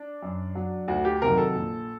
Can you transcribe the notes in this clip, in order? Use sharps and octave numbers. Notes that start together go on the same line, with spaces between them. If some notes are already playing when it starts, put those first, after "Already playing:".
Already playing: D4
F#2
F#3
D2 F#4
G4
C3 D#3 F#3 A#4
A4
A#1